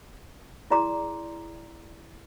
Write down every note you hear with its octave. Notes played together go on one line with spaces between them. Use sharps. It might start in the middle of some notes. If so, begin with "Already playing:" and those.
E4 G#4 D5 A#5 C6 D6